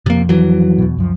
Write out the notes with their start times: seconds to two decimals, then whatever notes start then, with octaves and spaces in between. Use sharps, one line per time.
0.06 F2 C3 A#3
0.29 E3 F#3
0.78 E2 B2
0.97 C#2 F#2 F3